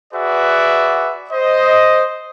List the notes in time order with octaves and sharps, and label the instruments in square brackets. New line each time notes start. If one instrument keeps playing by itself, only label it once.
[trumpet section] F#4 G#4 B4 D5 E5 F#5
C5 D#5